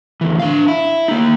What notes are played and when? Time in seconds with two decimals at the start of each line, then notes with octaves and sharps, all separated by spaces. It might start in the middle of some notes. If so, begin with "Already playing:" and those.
0.21 D2 E3
0.40 D4 F5
0.68 E4
1.08 A#3 D#4